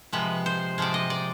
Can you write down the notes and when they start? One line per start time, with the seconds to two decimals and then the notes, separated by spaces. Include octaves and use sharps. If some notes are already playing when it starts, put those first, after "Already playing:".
0.13 C3 F3 G#3 B4
0.46 C5
0.78 C3 F3 G#3 D5
0.94 D#5
1.10 D5